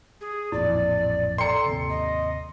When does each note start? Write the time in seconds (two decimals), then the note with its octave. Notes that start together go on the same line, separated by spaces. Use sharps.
0.20 G#4
0.52 A1 F2 A#2 E4 D5
1.38 A4 D5 G5 A#5 C6 C#7
1.66 G#1 D#2 C3
1.89 D#5